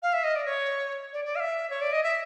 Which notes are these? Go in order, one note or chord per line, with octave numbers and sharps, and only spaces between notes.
F5
E5
D#5
D5
C#5
D5
D5
F5
E5
C#5
D5
D#5
E5